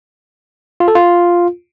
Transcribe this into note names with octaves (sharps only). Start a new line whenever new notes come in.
F4
A4
F4